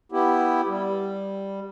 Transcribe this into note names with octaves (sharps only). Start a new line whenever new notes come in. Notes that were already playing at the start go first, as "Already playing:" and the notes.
B3 E4 G4
G3